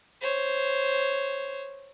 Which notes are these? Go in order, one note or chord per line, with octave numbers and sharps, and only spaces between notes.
C5 C#5